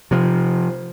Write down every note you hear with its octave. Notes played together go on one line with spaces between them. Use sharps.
C3 F3